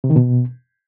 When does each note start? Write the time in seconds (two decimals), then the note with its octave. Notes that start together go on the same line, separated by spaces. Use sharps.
0.04 C3
0.10 D#3
0.16 B2